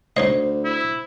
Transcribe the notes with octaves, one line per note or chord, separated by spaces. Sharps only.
D2 D#4 C5 C#5 D#5
E4